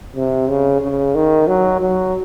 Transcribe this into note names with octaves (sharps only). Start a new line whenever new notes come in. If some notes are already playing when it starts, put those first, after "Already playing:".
C3
C#3
C#3
D#3
F#3
F#3